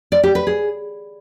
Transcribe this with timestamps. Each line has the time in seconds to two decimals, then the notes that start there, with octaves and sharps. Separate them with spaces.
0.12 D5
0.23 G4
0.35 B4
0.47 G#4